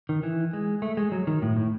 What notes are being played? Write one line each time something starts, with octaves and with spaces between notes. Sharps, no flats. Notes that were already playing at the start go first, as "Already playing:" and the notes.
D#3
E3
G#3
A3
G#3
F#3
D#3
A2
A2